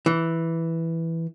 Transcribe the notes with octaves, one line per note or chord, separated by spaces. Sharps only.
E3